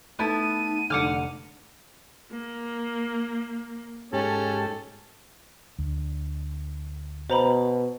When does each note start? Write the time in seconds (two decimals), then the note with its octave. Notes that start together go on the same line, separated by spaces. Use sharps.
0.19 A3 B3 D#4 E4 A5 D#7
0.90 F1 D3 F#5 D6 F6
2.31 A#3
4.13 G#2 C#4 G4 A4 A5
5.79 D2
7.30 B2 C5 A#5 B5